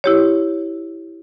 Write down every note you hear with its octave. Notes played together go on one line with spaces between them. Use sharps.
E4 G4 C#5